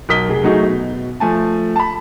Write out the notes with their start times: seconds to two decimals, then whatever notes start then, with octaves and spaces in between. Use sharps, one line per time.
0.09 B1 A#4 D#6 B6 G7
0.29 F1 G#4
0.43 F#3 A3 D#4 F#4 G#4
0.63 B2
1.20 F3 A3 G#5 A5
1.76 A5 B5